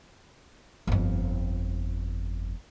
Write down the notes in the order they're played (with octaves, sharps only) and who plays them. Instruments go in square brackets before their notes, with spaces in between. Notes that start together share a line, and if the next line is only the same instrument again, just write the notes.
[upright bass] G1 F2